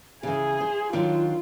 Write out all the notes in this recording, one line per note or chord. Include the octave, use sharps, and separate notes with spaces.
C#3 E3 G#4
C5
D#3 F#3 D4 F4